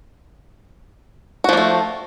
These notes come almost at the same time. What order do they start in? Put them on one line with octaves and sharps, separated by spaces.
F#4 F3 A#3 A3